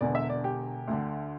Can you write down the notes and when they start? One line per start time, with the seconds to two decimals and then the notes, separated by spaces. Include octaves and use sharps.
0.01 E1 E2 D3 D5
0.15 E5
0.30 D5
0.44 G4
0.88 D2 D3